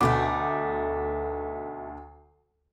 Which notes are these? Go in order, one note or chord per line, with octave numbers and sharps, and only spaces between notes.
D2 B2 A3 D#4 D6